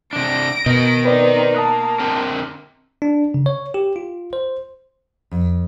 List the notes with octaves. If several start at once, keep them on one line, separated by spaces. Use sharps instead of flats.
C3 D4 A#6 D7
B2 A#4 D#5
C4 D#4 B4 D5
A#3 A5 D#6 F#6
D3 C4 A#4
D4
C#3
C#5
G4
F4
C5
F2